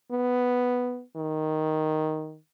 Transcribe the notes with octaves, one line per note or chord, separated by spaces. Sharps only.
B3
D#3